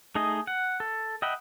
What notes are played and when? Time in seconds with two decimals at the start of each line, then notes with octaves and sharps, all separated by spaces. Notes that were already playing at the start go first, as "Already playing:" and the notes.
0.15 A3 D#4 G#4 D#5
0.47 F#5
0.80 A4
1.22 D#5 E5 F#5 G5 B5